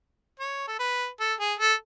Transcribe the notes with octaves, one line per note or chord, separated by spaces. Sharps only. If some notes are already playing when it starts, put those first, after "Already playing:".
C#5
A4
B4
A4
G#4
A4